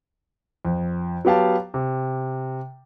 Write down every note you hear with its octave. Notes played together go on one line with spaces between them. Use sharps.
F2
F#3 B3 G4 F5 A5
C3